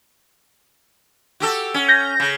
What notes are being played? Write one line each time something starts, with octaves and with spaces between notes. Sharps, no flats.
F#4 G4 A4
C#4
G6 A#6
C#3